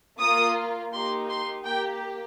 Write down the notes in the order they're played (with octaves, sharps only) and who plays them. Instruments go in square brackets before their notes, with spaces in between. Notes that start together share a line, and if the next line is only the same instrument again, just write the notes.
[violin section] A#3 F4 D#6
A#3 D#4 G4 C6
C6
A#3 G4 G5